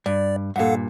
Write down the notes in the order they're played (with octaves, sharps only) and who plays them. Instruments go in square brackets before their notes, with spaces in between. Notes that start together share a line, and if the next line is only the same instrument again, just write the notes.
[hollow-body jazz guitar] G2 [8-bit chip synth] D5
[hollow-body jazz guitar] G2 A#2 [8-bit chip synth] A4 F5 F#5